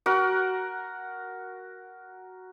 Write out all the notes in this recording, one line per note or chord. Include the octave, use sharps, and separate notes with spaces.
F#4 A#4 F#5